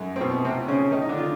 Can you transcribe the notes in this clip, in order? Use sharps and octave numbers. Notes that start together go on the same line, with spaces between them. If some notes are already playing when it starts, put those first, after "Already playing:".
Already playing: F#2 F#3
C4
B2 B3
C3 C4
C#3 C#4
D#3 D#4
D#4
D3 D4
F4